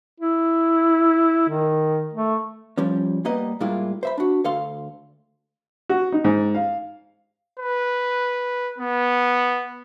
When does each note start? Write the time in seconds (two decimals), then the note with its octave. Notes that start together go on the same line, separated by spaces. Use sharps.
0.20 E4
1.49 D#3
2.13 A3
2.78 F3 G3 C#4
3.25 G3 A#3 B3 B4 D#5
3.60 A2 G3 G#3 A#3 E4 F4
4.03 C5 E5 B5
4.18 D4 F#4
4.45 D2 A4 F5 C6
5.89 F#4
6.12 D#4
6.24 G#2
6.55 F5
7.59 B4
8.78 B3